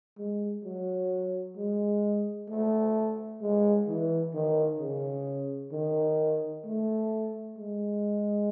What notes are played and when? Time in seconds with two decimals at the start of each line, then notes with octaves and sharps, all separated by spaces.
0.17 G#3
0.64 F#3
1.56 G#3
2.49 A3
3.41 G#3
3.87 E3
4.33 D#3
4.79 C#3
5.72 D#3
6.65 A3
7.57 G#3